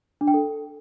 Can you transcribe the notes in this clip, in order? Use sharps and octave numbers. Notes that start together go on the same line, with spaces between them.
D4
G5
A4